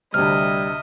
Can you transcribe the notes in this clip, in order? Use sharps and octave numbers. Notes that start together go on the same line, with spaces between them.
D2 C3 G3 D#5 E5 F6